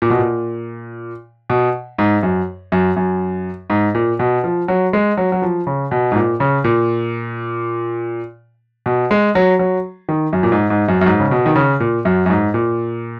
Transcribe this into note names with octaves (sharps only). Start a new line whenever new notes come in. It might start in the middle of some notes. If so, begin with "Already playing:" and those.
A#2
B2
A#2
B2
G#2
F#2
F#2
F#2
G#2
A#2
B2
F3
F#3
G#3
F#3
F#3
F3
C#3
B2
G#2
A#2
C#3
A#2
B2
G#3
F#3
F#3
D#3
F#2
A#2
G#2
G#2
F#2
F#2
G#2
C#3
B2
D#3
C#3
A#2
F#2
F#2
G#2
A#2